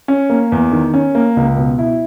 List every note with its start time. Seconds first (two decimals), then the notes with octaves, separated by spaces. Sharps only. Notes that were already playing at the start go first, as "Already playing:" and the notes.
0.08 C#4
0.30 A#3
0.52 E2
0.72 D#3
0.94 C#4
1.15 A#3
1.37 C#2
1.57 B2
1.78 E4